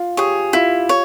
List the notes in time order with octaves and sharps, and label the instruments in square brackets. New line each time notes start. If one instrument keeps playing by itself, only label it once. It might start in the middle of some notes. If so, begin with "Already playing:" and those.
Already playing: [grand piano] F4
[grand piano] G4 [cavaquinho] G#4 C#5
[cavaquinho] E4 [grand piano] F4
[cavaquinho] C#5